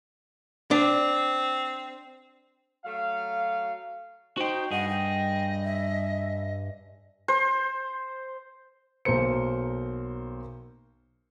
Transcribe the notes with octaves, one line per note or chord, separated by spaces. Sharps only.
C4 D4
F#3 A3 F5
D#4 F#4 C5 G5
G2 G#4 D#5 F#5
G5
E5
C5
B1 A#3 A#4 C5 C#7